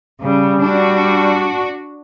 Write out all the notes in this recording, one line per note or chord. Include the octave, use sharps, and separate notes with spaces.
C#3 G3
D4 F#4